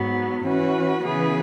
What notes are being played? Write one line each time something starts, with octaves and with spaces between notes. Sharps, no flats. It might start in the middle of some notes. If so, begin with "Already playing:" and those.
Already playing: G#2 F#3 B3
E3 C#4 F#4 B4
C#3 E3 B3 G#4 B4